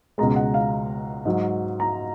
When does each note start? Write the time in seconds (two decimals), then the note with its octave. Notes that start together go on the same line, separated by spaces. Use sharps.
0.18 C#2 B2 G#3 A#5
0.36 F#5
0.54 F5
1.25 G#2 F#3
1.80 A#5